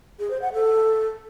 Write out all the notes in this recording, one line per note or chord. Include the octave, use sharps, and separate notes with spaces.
G#4
C5
F#5
A4